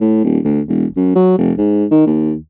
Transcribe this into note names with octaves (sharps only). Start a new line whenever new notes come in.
A2
D#1
D2
E1
F#2
F#3
F1
G#2
D#3
D#2